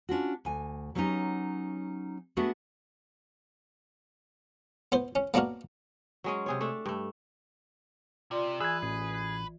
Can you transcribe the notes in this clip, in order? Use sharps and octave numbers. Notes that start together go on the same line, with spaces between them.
C#4 D4 F4 F#4
D2 G#5
F#3 G3 B3 C#4 D#4 G4
A3 B3 D4 F#4 G#4
B3 C5
C#4
A#3 B3 D4 F#4 A#4
F#3 G#3 C#4
C3 G#4 C#5
A3 D4
G2 A3
C3 F4 D5 C6
E3 G#4 B4 G#5 E6 F#6
A1 G#4